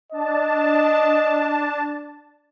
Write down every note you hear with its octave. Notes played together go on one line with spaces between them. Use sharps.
D4 D#5 A5